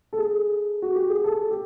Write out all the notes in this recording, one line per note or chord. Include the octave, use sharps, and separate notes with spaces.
A4
G#4
F#4
G4
G#4
A4
G4